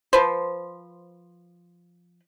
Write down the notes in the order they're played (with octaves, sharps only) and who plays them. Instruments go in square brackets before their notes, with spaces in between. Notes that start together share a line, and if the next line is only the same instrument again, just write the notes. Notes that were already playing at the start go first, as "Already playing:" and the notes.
[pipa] F3 B4 C5